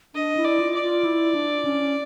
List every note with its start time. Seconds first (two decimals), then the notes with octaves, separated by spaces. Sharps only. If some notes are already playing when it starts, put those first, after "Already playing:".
0.15 D4 D#5
0.37 E4
0.44 D5
0.60 F4
0.75 D5
0.82 F4
1.04 E4
1.35 D4
1.65 C#4